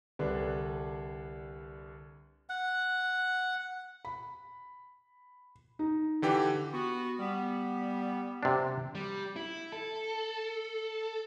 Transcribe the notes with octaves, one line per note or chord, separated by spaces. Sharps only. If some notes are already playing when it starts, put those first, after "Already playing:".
C2 D3 G3 D4 B4
F#5
B5
D#4
D3 E3 G4
B3 F#4
G3 B3
C3 D4
G3
E4
A4